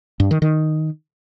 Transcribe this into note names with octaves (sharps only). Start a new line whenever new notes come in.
G2
D#3
D#3